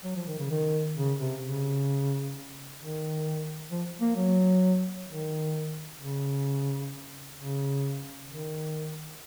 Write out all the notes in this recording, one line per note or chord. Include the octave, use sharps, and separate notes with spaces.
F#3
F3
D#3
C#3
D#3
C#3
C3
C#3
D#3
F3
A#3
F#3
D#3
C#3
C#3
D#3